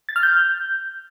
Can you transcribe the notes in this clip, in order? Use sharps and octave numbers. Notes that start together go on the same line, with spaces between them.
A6
F6
G6